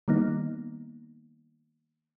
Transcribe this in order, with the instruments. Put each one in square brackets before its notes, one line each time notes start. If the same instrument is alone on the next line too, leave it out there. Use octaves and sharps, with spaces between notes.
[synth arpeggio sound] D#3 G3 A#3 B3 D#4